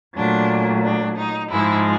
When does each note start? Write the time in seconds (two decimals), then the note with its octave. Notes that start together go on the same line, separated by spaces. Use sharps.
0.16 A#2 F#3 A3 D4
0.84 D4
1.17 D#4
1.50 G#2 F3 G#3 E4